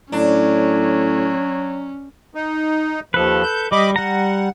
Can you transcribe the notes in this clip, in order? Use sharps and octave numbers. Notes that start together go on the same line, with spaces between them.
A2 F#3 C#4 D4
D#4
D#2 F3 A4 B4
G6
G3 D#5 B5 D6
G3 F#5 A#5